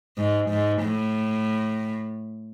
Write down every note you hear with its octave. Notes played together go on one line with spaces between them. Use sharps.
G#2
G#2
A2